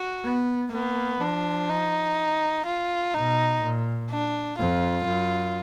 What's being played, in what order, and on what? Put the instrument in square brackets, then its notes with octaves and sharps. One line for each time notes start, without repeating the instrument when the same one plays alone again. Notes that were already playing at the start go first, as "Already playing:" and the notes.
Already playing: [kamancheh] F#4
[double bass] B3
[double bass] A#3 [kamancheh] B3
[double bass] F3 [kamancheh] D4
[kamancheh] D#4
F4
[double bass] B2 [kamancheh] D#4
[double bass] A#2
[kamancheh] D4
[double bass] F2 [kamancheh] F4
[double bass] F#2